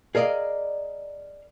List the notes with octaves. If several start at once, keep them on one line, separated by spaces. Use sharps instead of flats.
G#4 A#4 D5 D#5 F5